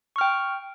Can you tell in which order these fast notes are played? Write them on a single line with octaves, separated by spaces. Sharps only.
C#6 F6 G5